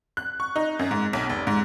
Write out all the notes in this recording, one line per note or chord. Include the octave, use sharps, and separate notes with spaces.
F#6
C#6
D#4
F#2
G#2
B1
F1
G#2